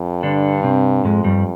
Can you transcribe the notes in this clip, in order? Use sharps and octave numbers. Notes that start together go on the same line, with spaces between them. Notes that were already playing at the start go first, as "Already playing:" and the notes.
Already playing: F2
G2 D3 D4
C3 C4
F2 G#2 G#3
G2 G3